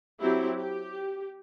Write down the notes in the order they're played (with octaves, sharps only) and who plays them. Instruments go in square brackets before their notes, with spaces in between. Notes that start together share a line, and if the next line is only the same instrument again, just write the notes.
[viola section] F#3 C4 E4 G4
G4